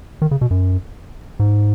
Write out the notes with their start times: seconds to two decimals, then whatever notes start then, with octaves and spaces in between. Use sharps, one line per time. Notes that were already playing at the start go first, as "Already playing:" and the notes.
0.22 D#3
0.31 C#3
0.41 B2
0.51 F#2
1.40 G#2